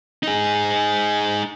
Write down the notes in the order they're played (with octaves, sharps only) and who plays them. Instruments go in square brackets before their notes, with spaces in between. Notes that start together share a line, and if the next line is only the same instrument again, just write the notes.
[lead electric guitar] D#4 G#4